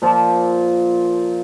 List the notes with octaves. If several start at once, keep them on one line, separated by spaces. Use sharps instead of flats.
A#2 F3